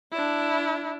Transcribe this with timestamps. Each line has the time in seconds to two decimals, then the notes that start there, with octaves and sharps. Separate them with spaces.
0.12 D4 E4